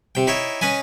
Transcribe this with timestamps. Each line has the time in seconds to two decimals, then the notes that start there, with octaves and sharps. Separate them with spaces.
0.15 C3 G5
0.27 D#4 E4 C#5 G5
0.61 C#4 B4 D#5 G#5